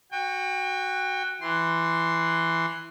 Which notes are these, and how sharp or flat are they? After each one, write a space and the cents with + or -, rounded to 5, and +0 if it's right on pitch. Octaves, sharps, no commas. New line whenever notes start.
F#4 +0 G5 +30
E3 +5 C6 +0